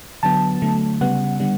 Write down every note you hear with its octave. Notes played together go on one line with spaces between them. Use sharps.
D3 F#3 B3 A5
D3 F#3 A3
C#3 G3 B3 F#5
D3 G3 B3